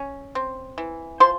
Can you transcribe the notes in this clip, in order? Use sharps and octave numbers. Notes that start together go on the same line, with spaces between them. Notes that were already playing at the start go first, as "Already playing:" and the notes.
Already playing: C#4
C4
E3
F3 C5 C6